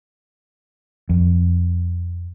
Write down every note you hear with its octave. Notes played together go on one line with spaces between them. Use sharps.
F2